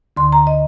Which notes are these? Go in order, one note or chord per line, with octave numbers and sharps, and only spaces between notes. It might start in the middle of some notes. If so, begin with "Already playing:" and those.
D2 D3 C6
A#5
D#5